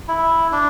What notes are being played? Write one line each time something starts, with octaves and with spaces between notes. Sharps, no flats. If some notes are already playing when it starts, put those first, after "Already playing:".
E4
D4